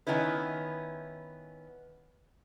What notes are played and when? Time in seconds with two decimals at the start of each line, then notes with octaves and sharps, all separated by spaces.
0.07 D#3 B3 C#4 E4 B4